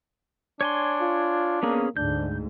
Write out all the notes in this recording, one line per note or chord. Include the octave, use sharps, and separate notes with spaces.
D4 C#5 G#5 C6
F4
A#3 B3 C#4 G#4
D2 G#2 D4 G6